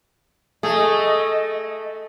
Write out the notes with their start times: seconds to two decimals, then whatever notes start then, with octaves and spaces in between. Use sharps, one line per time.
0.63 A3 G#4 D#5